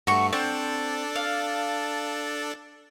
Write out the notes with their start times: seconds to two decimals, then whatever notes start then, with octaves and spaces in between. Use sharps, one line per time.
0.07 G2 A3 F#4 C#6
0.33 C4 D4 A4 D5
1.16 F5